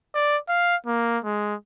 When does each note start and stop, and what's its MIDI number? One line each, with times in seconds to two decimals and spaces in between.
0.14 0.37 74
0.49 0.76 77
0.86 1.18 58
1.24 1.55 56